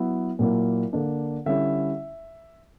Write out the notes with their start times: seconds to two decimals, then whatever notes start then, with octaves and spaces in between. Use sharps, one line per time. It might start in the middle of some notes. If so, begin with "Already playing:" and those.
Already playing: F#3 B3 E4
0.39 A#2 F#3 A#3 E4
0.93 D3 A#3 D4
1.46 D3 G3 C#4 E4 E5